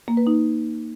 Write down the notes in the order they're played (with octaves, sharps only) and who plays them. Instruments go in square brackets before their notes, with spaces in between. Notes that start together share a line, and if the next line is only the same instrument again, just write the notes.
[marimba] A#3
B4
D#4